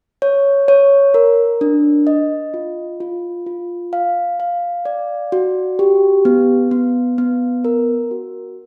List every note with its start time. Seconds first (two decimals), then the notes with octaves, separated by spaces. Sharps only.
0.22 C#5
0.68 C#5
1.14 A#4
1.61 D4
2.07 D#5
2.54 F4
3.00 F4
3.46 F4
3.93 F5
4.40 F5
4.85 D5
5.32 F#4
5.79 G4
6.25 B3
6.71 B3
7.18 B3
7.65 A#4
8.11 F#4